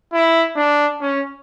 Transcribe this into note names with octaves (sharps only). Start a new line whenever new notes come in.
E4
D4
C#4